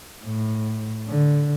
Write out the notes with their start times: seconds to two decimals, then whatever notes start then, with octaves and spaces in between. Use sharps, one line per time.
0.23 A2
1.09 D3